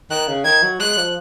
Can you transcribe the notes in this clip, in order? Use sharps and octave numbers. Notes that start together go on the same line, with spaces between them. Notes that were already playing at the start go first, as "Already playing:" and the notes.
D#3 F#6
C#3
D#3 G#6
F#3
G#3 F#6
F3